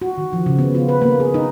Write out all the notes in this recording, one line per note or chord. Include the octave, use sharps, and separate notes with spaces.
F#4
D#3
F3
C#3
B3
F4
B4
A#3
G#4
D#4